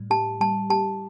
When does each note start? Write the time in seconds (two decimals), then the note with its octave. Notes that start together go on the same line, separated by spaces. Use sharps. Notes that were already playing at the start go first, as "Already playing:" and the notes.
Already playing: A2 G3
0.10 G4 A5
0.41 G3 A5
0.70 G4 A5